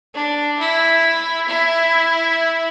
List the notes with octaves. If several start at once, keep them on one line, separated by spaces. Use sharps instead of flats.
D4
E4
E4